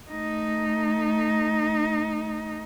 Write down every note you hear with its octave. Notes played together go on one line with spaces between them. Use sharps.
A3 D#4